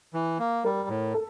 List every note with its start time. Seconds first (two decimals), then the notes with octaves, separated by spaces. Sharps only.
0.14 E3
0.39 A#3
0.65 G3 A#4
0.89 A2
1.14 A4